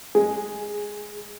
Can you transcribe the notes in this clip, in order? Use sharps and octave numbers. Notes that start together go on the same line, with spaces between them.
G#3 G#4